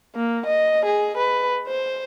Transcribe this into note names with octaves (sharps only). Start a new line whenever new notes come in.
A#3
D#5
G#4
B4
C5